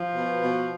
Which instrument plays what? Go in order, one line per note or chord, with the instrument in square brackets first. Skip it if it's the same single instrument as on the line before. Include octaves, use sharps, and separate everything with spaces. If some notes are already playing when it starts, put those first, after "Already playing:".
Already playing: [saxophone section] F3
B2
B2